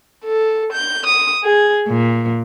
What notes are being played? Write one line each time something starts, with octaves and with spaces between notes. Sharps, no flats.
A4
G6
D#6
G#4
A#2